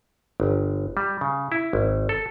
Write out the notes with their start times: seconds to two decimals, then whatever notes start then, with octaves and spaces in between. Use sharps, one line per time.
0.40 G1
0.97 G3
1.21 C#3
1.52 E4
1.73 G#1
2.09 A4